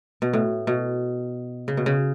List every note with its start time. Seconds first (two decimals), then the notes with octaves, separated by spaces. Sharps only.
0.22 B2
0.33 A2
0.67 B2
1.68 C#3
1.77 B2
1.86 C#3